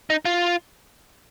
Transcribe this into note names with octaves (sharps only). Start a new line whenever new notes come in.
D#4
F4